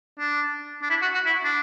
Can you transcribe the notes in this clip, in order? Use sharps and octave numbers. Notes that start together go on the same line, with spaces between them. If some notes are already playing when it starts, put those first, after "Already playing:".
D4
D4
E4
F#4
F#4
E4
D4